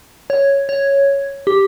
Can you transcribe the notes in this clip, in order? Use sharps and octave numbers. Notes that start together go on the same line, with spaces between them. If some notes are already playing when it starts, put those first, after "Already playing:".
C#5
C#5
G4